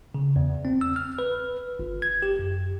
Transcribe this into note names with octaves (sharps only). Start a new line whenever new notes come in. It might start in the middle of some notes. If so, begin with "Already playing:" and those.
C#3
E2
C4
E6
F6
B4
G1
G#6
G4
F#2